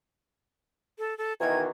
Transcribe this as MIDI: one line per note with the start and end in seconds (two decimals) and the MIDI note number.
0.99 1.16 69
1.18 1.33 69
1.41 1.67 47
1.41 1.67 51
1.41 1.67 52
1.41 1.60 92